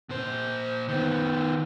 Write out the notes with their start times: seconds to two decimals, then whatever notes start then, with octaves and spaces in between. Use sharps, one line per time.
0.09 A#2 C5
0.88 D#3 B3